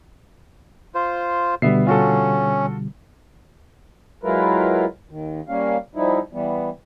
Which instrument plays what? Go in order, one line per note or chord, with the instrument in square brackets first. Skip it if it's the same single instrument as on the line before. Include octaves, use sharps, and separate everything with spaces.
[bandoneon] F4 C5
[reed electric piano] B2 D3 G3 [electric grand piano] B3 E5 C7
[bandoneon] C#4 [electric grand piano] F4 F#4 A4
[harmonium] F#3 G#3 E4 F4 A#4 B4
D#2 D#3
G3 A#3 C#4 F5
F3 G3 D#4 E4
E3 G3 B3